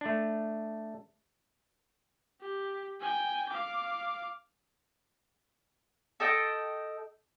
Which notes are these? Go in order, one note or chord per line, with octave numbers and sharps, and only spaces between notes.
A3 D4
G4
G5 G#5
F5 D6
A4 D#5 G5